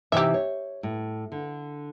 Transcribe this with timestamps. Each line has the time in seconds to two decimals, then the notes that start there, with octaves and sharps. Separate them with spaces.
0.12 C3 E3 D#4 G4 E5
0.34 C#5
0.83 A2
1.32 D3